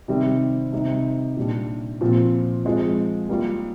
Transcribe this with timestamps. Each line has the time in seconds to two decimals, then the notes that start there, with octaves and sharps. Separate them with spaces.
0.08 C3 D#3 G3 C4
0.73 C3 G3 C4 D#4
1.36 A#2 G3 D4
2.01 A#2 F3 C4
2.65 F3 G#3 C4
3.29 G3 A#3 F4